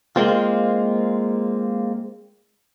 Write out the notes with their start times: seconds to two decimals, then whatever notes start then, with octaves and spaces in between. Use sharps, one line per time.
0.16 G#3 A#3 C4 F4